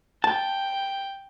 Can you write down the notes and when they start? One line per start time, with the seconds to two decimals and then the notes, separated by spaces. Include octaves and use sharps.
0.24 G5 A5